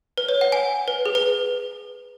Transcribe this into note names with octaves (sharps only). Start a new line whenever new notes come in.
B4
C#5
F#5
G#5
B4
G#4
B4